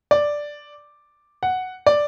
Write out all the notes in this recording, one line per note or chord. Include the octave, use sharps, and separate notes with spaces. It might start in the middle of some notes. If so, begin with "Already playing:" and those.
D5
F#5
D5